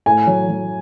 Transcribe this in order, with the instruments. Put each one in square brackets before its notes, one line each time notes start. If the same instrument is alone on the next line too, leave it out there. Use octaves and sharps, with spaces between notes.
[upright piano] A2 G#5
F#3
F#3